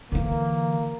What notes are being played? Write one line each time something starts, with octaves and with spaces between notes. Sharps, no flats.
D3 E3 A#3